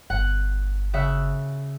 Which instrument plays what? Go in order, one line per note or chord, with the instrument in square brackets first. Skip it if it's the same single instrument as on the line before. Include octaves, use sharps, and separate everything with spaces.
[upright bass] G1 [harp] F#5
[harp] C#3 E5 F#5